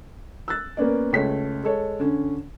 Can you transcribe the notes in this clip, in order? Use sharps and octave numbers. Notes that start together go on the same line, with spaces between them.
E6 F#6 A6
A#3 B3 C#4 D5
C#2 A3 C#5 B6
G#3 A4 C#5
D3 C#4